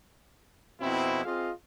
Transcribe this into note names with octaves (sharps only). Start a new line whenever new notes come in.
F2 B2 C4 E4
C4 F4 G#4 D#5 F5